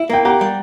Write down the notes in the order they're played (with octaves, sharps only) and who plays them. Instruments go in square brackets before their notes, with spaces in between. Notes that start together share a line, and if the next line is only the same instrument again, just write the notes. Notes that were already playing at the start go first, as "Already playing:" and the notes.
Already playing: [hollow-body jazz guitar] E4 [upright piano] E5
[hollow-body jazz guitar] A#3 [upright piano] G5
[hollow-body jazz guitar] G4 [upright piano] F#5 A#5
[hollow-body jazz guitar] G3